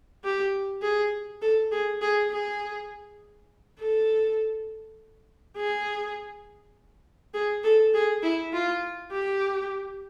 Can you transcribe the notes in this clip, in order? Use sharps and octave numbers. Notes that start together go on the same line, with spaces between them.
G4
G#4
A4
G#4
G#4
G#4
A4
G#4
G#4
A4
G#4
E4
F4
G4